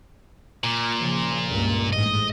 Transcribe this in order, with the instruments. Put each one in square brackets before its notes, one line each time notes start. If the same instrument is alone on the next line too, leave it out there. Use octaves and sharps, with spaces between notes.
[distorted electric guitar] A#2
[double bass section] C#3 F3
C#2 G2 A#3
[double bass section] A1 G#2 [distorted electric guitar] D#5